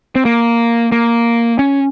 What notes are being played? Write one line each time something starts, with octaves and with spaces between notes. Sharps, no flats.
C4
A#3
A#3
C#4